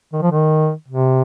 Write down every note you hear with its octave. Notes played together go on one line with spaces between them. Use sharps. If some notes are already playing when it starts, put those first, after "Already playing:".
D#3
F3
D#3
C3